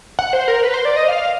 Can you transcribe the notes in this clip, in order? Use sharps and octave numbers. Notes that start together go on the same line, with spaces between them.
F#5
C5
A#4
B4
C5
D5
D#5
F5